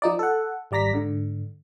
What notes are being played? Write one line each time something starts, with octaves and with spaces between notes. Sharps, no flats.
F3 D#4 D5
A4 F#5
G#1 G3 D5 A#5 A#6 B6
G#2 D3